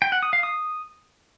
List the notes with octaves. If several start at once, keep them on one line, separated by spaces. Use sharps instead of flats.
G5
F#5
D#6
F5
D#6